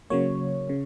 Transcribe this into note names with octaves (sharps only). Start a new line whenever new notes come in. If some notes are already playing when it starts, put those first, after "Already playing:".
C#3 F#3 A#3 C#5
C#3